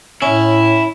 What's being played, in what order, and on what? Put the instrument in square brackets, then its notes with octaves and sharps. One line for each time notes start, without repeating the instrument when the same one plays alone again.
[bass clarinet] A2 [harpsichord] C#4 [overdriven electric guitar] E4